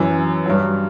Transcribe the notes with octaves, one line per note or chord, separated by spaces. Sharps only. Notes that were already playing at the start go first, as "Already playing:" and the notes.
Already playing: F#2 E3
G2 F#3